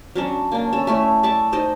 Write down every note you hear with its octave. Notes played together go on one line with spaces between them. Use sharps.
F#3 C#4 D4
A#3 D4
C#4 A4
A3 C#4 E4
D5 E5 A5 C#6
D#4 C5 D5 D#5